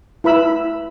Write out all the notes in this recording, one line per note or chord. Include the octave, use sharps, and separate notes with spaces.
E4 B4 B5 E6